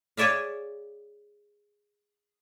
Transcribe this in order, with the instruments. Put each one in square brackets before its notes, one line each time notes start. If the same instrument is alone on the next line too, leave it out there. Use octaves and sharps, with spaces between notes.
[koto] G#4 C#5 D5 E5 F5